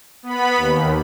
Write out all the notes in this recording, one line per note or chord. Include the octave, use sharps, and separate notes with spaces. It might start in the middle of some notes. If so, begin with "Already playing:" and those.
B3 B5
D#2